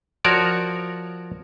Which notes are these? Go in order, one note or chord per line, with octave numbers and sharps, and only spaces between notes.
F3 F#4 A#4 C#5 D5